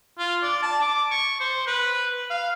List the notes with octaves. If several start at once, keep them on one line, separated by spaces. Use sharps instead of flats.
F4
D5
A5
D6
C#6
C5
B4
F5